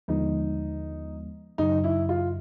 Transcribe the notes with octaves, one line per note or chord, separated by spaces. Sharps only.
D#2 D3 F3 G#3 B3 D#4
F#2 C#3 F#3 D#4
E4
F4